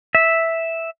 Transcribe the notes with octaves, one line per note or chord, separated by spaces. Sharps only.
E5